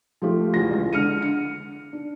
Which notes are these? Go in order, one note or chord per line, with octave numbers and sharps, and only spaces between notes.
F3 A3 F4 G4
E2 F4 A#6
C#2
D3 F6 C#7 D#7
C#7
D4